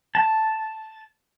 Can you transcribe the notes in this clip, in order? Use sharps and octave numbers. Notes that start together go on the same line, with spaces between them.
A5